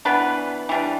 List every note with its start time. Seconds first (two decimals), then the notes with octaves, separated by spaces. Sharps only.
0.05 E3 B3 D4 B4
0.69 E3 G3 D4